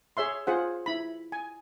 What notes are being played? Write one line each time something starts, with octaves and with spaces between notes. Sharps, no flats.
G#4 C#5 E5 C6
F4 G#4 C5 F#5
E4 B5
G#5